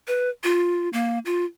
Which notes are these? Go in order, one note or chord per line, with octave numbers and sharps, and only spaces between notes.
B4
F4
A#3
F4